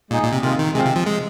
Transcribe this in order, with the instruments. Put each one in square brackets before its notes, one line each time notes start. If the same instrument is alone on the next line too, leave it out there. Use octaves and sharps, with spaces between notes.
[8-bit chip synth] A#2 [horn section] G#3 D#4 G#4
[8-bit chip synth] A#2
C3
[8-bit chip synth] C3 [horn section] D#3 G#3 F4
[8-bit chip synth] D#3
[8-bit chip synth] C3 [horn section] G#3 C4 F4
[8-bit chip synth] C3
F3
G#3